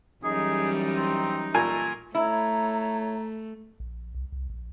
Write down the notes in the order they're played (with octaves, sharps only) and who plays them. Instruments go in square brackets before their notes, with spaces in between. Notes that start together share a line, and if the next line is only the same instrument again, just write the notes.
[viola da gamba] F#2 E3 G3 [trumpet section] D#4 [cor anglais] G#4
[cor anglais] C4
[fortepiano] A#2 A#4 G#5 [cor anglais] A3
[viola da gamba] A3 [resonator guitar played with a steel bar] E4 [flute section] C#5 A#5
[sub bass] A#1
C2
C2
A#1